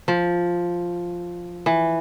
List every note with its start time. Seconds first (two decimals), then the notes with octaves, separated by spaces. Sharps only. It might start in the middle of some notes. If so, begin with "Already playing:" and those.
0.08 F3
1.66 E3